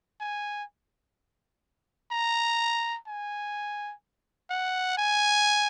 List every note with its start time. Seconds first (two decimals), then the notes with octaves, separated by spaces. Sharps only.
0.21 G#5
2.12 A#5
3.07 G#5
4.50 F#5
4.98 G#5